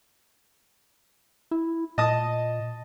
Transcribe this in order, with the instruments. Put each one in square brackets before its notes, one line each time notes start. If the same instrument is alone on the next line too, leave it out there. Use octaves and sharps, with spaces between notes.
[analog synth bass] E4
[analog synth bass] A#2 [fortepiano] D#5 A5 D#6